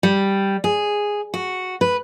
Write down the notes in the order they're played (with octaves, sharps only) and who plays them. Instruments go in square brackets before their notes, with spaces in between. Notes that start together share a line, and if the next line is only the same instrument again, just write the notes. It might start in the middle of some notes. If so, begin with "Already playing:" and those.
[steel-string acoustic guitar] G3
G#4
F#4
B4